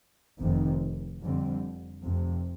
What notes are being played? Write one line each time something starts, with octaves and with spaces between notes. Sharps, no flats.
F1 F2 C3 D#3
F2 D3 G3 C4
F1 F2 C3